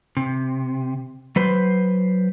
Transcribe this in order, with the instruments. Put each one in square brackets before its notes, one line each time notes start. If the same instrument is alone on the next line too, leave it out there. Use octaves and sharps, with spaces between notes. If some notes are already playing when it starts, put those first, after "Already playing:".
[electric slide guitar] C3
F#3 B4 C5